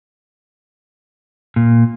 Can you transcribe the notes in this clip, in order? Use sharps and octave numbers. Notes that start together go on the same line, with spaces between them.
A#2